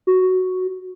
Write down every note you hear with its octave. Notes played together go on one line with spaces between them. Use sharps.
F#4